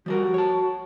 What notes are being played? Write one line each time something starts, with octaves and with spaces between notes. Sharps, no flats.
F3 G3 F#4 A#4
C#5 A5